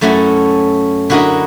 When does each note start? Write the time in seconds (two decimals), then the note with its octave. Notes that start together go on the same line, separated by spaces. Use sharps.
0.01 F#2 A3 C#4 E4 F#4
1.10 D3 E4 F#4 A#4 D#5 B5